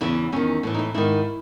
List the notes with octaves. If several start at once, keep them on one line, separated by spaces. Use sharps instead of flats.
E2 C#3 E3 E4
E2 D#3 C#4
A2 E3
D#4
E4
G#2 D#3 E4